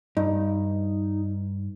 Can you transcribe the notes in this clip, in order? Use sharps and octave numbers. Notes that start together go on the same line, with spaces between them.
G2 D#4